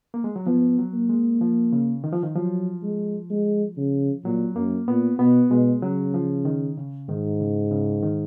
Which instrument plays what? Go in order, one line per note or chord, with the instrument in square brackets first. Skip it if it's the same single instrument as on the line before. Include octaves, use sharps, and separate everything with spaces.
[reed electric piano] A#3
G#3
F#3
[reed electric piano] F3 [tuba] B3
[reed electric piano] F#3
[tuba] A#3
[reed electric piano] G#3
F3
C#3
D#3
F3
D#3
[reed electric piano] F3 [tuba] F#3
[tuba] G#3
G#3
C#3
[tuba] A#2 [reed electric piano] F#3
[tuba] F#2 [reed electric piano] A#3
[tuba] A#2 [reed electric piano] B3
[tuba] B2 [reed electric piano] B3
[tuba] B2 [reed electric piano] G#3
[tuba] C#3 [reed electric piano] F#3
[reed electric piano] F3
D#3
C#3
[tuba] G#2 [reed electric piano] D#3
[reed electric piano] C#3
C#3
D#3